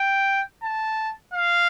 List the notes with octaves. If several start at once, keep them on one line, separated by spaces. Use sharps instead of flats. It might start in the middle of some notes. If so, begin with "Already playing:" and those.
Already playing: G5
A5
F5